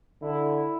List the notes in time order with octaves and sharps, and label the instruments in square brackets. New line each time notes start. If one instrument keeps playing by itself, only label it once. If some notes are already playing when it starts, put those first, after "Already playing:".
[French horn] D3 [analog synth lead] E4